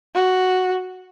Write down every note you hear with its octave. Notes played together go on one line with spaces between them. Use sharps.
F#4